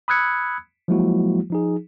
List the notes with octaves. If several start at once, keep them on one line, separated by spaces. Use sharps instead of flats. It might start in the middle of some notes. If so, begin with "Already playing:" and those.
B5 D#6 E6 F#6 G#6 C#7
F3 F#3 G#3 A#3 E4 F#4
F3 D#4 G#4